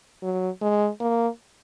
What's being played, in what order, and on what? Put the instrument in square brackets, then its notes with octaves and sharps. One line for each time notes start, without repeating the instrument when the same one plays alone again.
[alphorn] F#3
G#3
A#3